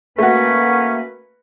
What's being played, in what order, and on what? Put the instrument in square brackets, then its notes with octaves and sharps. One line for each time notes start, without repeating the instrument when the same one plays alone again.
[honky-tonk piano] A3 F#4 [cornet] A#3 [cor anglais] C#4 [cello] B4